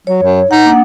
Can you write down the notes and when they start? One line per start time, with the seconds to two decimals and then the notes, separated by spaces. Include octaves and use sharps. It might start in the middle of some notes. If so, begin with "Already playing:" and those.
0.07 F#3 C#5
0.23 F#2
0.51 D#4 F#5 A#5
0.66 A#3 D4 F#5